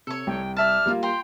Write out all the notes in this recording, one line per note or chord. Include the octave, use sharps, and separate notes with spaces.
C3 A4 C#5
C2 G5
D5 E5 A5 F6
G3 A#3 F4
G5 A#5 C6